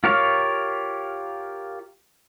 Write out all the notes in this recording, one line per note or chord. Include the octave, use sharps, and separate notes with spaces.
F4 G4 A#4 C#5 F5